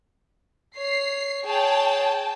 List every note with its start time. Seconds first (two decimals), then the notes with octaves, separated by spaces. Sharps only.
0.77 C#5 C7
1.45 G#4 C#5 G5 A5